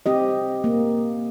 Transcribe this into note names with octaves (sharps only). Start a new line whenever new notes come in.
C4 G4 D#5
A#3